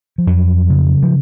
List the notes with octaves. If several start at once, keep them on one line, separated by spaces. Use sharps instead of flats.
F3
F2 F#3
C#3
F3